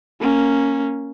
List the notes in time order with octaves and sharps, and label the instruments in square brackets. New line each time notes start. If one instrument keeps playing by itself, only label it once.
[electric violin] A#3 C#4